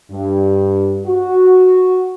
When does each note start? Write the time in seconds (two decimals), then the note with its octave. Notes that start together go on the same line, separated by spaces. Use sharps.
0.11 G2
1.06 F#4